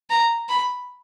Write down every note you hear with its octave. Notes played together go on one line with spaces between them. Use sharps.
A#5
B5